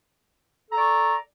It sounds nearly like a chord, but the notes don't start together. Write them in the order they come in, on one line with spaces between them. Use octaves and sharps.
A4 A#5 D5 C#6